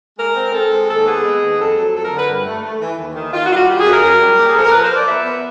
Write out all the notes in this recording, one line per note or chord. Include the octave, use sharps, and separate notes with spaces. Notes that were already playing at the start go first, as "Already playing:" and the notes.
G#3 A#4
C4
C4 A4
G#3
D#2 A4
B3 G#4
G#3
D#2
F2 A4
F#3 A4
F2 A4
A#4
D3
B4
G2
A3
A3
E3
D#2
D#3
D#3 F4
F#4
G3 F4 F#4
D#3 G4
F#2 G#4
A#4
F#2
G3
A#2 G4
G#4
F3 A4
A#4
F3 B4
C5
F3
D5
B3 E5
B3